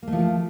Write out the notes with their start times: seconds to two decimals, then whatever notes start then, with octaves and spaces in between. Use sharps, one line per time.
0.03 A#3
0.07 A3
0.12 F3